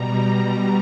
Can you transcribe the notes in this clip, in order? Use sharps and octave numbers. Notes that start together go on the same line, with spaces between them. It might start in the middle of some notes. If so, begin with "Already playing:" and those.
Already playing: B2 G3 A#5